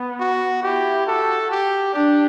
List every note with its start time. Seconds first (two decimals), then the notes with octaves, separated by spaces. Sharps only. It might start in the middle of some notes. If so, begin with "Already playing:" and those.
Already playing: B3
0.20 F#4
0.63 E4 G4
1.07 F#4 A4
1.51 G4
1.94 D4 G4